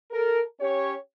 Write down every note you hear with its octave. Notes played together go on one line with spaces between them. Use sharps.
A4 A#4
C#4 G4 C#5